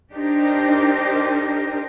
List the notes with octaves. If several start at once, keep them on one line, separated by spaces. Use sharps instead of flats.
D4 D#4 G4 A#4 C5